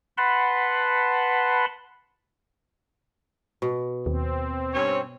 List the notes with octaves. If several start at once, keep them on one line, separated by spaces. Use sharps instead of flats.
B4 F#5 A5 B5 C6
B2
D#2 C4
G2 C#4 C#5